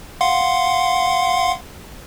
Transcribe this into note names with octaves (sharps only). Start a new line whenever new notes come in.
F5 F#5 C6